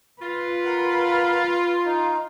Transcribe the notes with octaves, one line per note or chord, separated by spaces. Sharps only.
F4 B4
A#4 F5 F#5
D#4